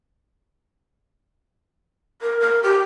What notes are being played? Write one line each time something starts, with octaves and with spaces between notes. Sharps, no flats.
A#4
A#4
G4